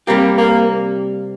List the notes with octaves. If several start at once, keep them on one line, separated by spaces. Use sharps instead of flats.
C3 G3 A#3 C4 G4
A#3